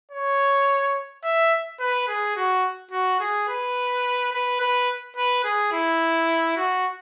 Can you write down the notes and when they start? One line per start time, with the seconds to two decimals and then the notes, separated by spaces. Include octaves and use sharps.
0.12 C#5
1.24 E5
1.80 B4
2.08 G#4
2.36 F#4
2.91 F#4
3.20 G#4
3.48 B4
4.32 B4
4.60 B4
5.17 B4
5.44 G#4
5.72 E4
6.56 F#4